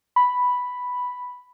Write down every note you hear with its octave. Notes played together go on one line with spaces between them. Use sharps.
B5